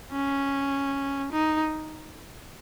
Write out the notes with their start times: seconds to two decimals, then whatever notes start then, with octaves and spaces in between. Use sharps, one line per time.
0.12 C#4
1.32 D#4